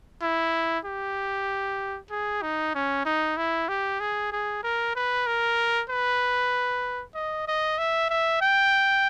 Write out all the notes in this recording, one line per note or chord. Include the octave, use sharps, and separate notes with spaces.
E4
G4
G#4
D#4
C#4
D#4
E4
G4
G#4
G#4
A#4
B4
A#4
B4
D#5
D#5
E5
E5
G5